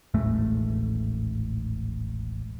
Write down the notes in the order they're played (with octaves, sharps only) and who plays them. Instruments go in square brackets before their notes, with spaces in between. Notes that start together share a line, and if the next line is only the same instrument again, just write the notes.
[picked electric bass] D#1 A1 G#2 A3